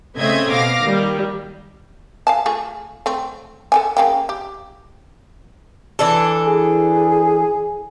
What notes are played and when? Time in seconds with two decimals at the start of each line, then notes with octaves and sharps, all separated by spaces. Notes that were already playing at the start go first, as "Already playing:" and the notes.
0.16 C#3 A3 C4 D#5 E5 G#6
0.50 B2 F5 D6 A#6
0.83 D#3 G3 A#3
2.27 F5 G#5 A5
2.46 A3 F4 G#4
3.06 A3 C4
3.72 A4 G5 G#5
3.97 C#3 A#3 G5
4.29 G4
5.99 E3 D4 A4
6.47 G#4